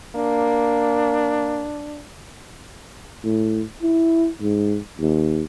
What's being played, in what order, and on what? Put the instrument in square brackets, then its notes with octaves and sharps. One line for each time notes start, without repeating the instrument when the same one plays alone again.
[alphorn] A#3 [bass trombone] D4
[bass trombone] A2
E4
G#2
D#2